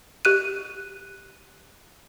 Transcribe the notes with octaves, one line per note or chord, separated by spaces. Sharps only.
G4 F#6 D#7